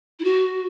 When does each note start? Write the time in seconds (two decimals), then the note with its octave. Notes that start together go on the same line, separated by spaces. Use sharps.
0.19 E4
0.24 F#4